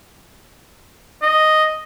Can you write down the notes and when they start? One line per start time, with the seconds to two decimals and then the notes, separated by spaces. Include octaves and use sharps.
1.22 D#5